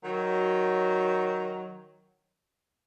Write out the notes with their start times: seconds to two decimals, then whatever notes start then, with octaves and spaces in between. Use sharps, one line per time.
0.04 D#3 F#3